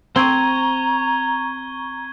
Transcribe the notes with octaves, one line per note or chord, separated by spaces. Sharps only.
C4 A#5 C#6 G#6 G7